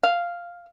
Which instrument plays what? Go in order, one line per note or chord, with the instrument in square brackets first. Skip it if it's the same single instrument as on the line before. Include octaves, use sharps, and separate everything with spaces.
[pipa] F5